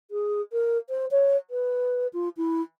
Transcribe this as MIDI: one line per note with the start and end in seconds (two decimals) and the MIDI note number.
0.11 0.41 68
0.52 0.78 70
0.89 1.06 72
1.11 1.36 73
1.50 2.07 71
2.13 2.29 65
2.37 2.61 64